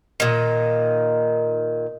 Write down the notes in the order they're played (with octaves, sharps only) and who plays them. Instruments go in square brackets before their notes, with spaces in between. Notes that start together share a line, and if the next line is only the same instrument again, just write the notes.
[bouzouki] A#2 D#3